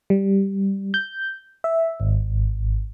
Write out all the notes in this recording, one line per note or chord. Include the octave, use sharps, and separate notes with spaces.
G3
G6
E5
G#1